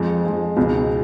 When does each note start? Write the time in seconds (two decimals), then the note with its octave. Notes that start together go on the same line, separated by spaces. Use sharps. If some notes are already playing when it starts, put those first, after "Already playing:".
Already playing: F2 F3 G#3
0.24 F2 F3 G#3
0.56 C#2 B2 G#3 D#4